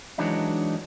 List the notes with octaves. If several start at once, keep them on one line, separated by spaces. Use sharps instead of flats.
E3 F#3 G#3 D4 D#4